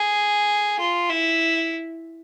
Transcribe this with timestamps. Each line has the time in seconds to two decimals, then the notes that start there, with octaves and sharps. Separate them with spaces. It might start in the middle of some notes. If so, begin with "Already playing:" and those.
Already playing: G#4
0.79 F4
1.10 E4